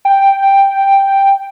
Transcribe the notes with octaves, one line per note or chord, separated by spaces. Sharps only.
G5